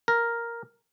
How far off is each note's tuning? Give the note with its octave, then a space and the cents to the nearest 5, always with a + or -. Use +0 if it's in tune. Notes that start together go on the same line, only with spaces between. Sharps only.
A#4 +0